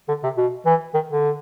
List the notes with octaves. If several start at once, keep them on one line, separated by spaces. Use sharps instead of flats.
D3
C3
B2
E3
D#3
D3